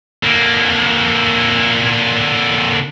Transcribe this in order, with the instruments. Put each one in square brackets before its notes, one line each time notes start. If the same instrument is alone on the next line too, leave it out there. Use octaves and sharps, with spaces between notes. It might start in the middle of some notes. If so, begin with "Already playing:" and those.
[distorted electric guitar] D3 A#3